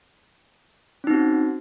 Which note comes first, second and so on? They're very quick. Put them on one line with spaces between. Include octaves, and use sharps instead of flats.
C#4 D#4 C4 F#4